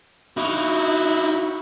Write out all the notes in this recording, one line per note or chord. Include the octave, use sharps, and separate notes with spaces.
D#4 E4 F#4